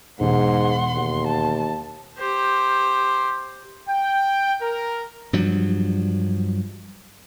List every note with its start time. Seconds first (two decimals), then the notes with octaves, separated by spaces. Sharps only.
0.20 E1 G#2 F#5 C6
0.95 D#2
1.27 A5
2.18 G4 C5
3.87 G5
4.60 A#4
5.33 G2 F3 F#3